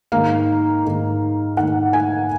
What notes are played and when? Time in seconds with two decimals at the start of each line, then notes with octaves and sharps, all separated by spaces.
0.12 G#2 D#3 A#3 F5
0.85 G#2 D#3 A#3
1.57 G#2 D#3 A#3 F#5
1.93 G#5